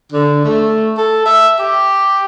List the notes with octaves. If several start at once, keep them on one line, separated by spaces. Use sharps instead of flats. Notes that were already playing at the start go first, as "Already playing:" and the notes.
D3
A3
A4
E5
G4